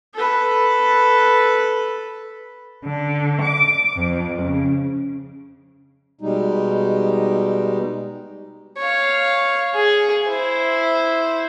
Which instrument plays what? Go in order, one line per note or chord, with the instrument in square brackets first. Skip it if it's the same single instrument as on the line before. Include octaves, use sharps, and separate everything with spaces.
[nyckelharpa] A4 B4
[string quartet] D3
D6
F2
C#3
[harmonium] B2 G3 G#3 D#4
[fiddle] C#5 F5
G#4
E4 C5